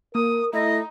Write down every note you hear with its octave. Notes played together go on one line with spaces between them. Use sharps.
A#3 A#4 D#6
A3 D#4 E4 D#5